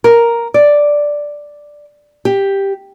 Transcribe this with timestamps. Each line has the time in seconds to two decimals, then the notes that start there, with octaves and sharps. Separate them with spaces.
0.04 A#4
0.54 D5
2.25 G4